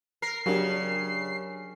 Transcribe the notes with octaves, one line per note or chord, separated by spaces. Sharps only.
A#4 C7
C#3 F#3 D4 G4 A#4